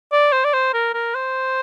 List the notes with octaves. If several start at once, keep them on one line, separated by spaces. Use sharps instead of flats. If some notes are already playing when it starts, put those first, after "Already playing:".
D5
C5
D5
C5
A#4
A#4
C5